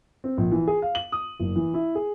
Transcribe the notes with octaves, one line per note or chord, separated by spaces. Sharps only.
C4
A#1
E3
G#4
F5
F#7
D#6
F#1
E3
E4
G#4